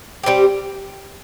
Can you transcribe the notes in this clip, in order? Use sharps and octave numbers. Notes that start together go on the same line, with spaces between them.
G3 C4 G4